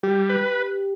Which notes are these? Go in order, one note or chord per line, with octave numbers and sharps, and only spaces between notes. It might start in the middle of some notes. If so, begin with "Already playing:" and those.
G3 G4
B4